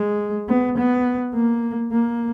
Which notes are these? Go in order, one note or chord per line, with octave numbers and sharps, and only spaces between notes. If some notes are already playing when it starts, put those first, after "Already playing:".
Already playing: G#3
B3
B3
A#3
A#3